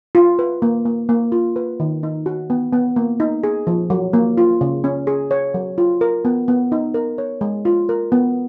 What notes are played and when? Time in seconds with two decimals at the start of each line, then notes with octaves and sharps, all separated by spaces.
0.15 F4
0.39 B4
0.62 A#3
0.85 A#3
1.09 A#3
1.32 F4
1.56 B4
1.80 D#3
2.03 D#4
2.26 F#4
2.50 B3
2.73 B3
2.96 A#3
3.20 D#4
3.43 G#4
3.67 F3
3.90 F#3
4.13 A#3
4.37 F4
4.61 C#3
4.84 C#4
5.07 G#4
5.31 C#5
5.54 F#3
5.78 F4
6.01 A#4
6.25 B3
6.48 B3
6.72 D#4
6.94 A#4
7.18 C#5
7.41 G#3
7.65 F4
7.89 A#4
8.12 B3